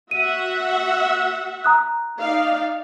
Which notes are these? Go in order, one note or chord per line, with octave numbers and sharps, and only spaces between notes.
F#4 E5 F#5 D#7
A#5 D#6 F#6
D#4 D5 F5